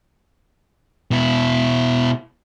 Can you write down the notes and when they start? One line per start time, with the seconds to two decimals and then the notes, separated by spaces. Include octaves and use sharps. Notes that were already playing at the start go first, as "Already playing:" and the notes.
1.11 B2 E4